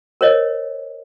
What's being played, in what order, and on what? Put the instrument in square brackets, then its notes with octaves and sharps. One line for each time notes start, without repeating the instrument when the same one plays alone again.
[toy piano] A#4 C5 C#5 D#5